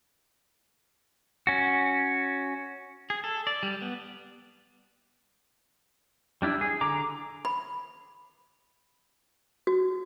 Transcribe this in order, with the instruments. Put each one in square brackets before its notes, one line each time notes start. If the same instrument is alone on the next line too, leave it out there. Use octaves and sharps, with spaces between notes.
[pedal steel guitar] C#4 F#4
G#4
A4
D5
G3
B3
G3 D4 E4
G#4
D3 A#5 D6
[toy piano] B5
F#4